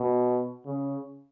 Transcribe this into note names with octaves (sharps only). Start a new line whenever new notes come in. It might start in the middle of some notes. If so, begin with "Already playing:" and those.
Already playing: B2
C#3